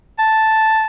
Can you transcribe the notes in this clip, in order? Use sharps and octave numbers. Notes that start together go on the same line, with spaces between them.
A5